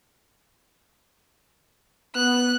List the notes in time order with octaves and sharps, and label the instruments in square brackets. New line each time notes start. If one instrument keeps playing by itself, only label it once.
[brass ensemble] B3 [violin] F#6